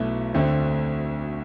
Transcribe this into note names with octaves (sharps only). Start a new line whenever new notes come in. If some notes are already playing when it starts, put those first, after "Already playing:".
Already playing: B1 B2 A3 E4
D2 D3 A3 C4